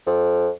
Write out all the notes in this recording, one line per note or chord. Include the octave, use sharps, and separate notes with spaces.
F2